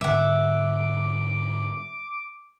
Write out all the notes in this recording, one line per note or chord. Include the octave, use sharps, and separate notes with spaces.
G#2 D3 G3 E5 F#5 D6